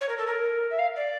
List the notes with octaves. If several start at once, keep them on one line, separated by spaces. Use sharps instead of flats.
C#5
A#4
A4
A#4
E5
F5
D5